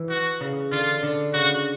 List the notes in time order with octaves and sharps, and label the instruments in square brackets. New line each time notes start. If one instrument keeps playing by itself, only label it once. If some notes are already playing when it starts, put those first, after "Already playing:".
Already playing: [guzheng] E3
[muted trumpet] F#4
[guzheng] C#3
[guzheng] D3 [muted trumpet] F4
[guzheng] D3
[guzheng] C#3 [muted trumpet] F#4